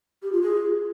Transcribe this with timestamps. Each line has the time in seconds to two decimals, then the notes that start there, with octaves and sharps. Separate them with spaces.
0.23 G4
0.32 F4
0.42 G#4